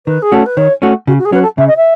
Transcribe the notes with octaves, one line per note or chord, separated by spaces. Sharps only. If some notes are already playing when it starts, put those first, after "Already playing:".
D#3 B4
G#4
A3 C#4 F#4 A4
B4
D#3 C#5
A3 C#4 F#4
C#3 F#4
F#4
G#4
F#3 C#4 F#4 B4
A4
C#3 E5
D#5
E5